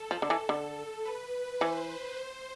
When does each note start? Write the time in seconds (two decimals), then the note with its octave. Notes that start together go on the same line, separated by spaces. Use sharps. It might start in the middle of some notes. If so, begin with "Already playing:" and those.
Already playing: A4
0.11 F3
0.22 D3
0.30 E3
0.49 D3
1.05 B4
1.61 E3 C5
2.17 C5